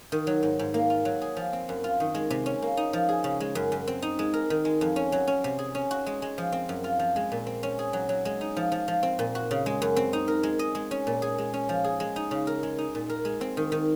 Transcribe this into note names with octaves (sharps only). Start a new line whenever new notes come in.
D#3
F#3
G#2
G#2
A#3
F4
F#3
G#4
F3
C4
F#2
F4
D#3
G#3
C3
C#4
A#3
D#4
F3
G#4
C#3
G#3
F#2
F#2
C4
D#4
G#3
A#4
D#3
G#3
F2
C#4
F#3
C#4
C3
G#4
C#4
F#4
G#3
G#3
F3
C4
F#2
F4
F3
G#3
A#2
C4
C#4
G#4
F#3
F#3
G#3
D#4
F3
F3
F3
C4
A#2
F#4
C#3
G#3
F#2
C4
D#4
A#4
G#3
D#5
G#3
C#4
A#2
G#4
G#3
C#4
F3
G#4
G#3
D#4
C#3
A#4
G#3
D#4
A#2
A#4
G#3
C4
D#3
D#3